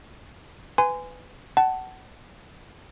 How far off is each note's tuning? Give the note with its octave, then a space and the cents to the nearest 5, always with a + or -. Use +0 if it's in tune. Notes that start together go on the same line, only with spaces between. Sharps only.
B4 +20 G#5 -5 C6 -30
F#5 +25 A5 +0